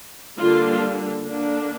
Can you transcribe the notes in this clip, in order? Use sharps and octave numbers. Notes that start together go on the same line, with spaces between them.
D3 G3 A#3 D4 F4
D3 A#3 D4